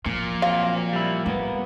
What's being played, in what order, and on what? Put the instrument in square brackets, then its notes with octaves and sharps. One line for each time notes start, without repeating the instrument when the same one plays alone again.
[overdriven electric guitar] A#2 [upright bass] F3
[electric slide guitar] F#3 C4 F4 [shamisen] F5
[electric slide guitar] G3 E4
[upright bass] G3 [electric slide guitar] A#3 B3